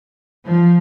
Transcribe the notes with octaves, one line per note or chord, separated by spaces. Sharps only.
F3